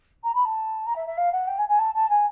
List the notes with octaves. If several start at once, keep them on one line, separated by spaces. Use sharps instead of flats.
A#5
B5
A5
A#5
E5
E5
F5
F#5
G5
G#5
G#5
A5
A5
G#5